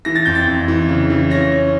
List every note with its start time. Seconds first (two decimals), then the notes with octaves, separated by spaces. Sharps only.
0.05 E3 A#6
0.15 A6
0.25 F2 G6
0.35 A6
0.48 F2
0.68 E3
0.89 C#3
1.10 E3
1.30 C#4 A#6
1.52 C#4